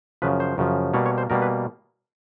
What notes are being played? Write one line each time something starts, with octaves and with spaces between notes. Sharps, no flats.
F#2 C#3 F3 B4
C5
F#2 C#3 F3
B2 G3 A#3 C#5
C#5
C5
B2 G3 A#3 A#4
B4